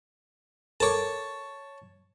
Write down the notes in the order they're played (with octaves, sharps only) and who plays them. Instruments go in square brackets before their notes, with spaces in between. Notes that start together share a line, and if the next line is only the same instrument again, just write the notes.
[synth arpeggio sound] A4 A#4 D6 [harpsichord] C#5 A5